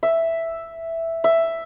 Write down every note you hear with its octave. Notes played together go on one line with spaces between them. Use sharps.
E5
E5